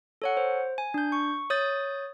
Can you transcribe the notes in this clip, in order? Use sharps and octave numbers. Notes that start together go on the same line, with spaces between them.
A4 C#5 F#5
C5
G#5
D4 G6
C#6
C#5 D#6 G6 A6